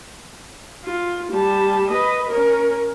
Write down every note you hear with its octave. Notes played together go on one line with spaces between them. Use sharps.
F4
G3 A5
B4 D#5
C#4 A#4